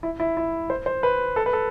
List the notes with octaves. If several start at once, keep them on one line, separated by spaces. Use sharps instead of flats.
E4
E4
E4
C5
C5
B4
A4
B4
A4